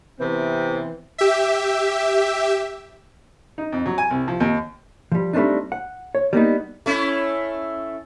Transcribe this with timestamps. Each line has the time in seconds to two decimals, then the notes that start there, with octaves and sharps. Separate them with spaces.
0.19 C3 E3 B3 C4
1.18 G4 E5
3.58 D#4
3.72 F2
3.86 F#3
3.98 G#5
4.10 C2
4.28 F3
4.40 D#2
5.12 F3 G3
5.33 G3 A3 C4 D4 D#4
5.72 F#5
6.15 C#5
6.33 G3 A#3 B3 D#4
6.86 A3 C#4 E4